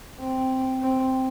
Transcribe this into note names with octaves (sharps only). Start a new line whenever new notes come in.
C4
C4